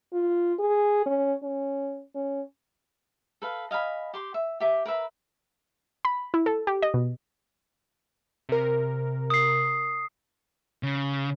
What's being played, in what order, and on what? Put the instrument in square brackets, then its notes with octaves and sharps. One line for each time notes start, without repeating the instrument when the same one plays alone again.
[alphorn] F4
G#4
C#4
C#4
C#4
[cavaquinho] A4 B4 F5
D#5 F5 G#5 B5
G4 C6 D6
E5
G4 E5 D6
A#4 B4 E5 B5
[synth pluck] B5
E4
A4
G4
D#5
B2
[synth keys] C3 A#4
[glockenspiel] D#6 C7
[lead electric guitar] C#3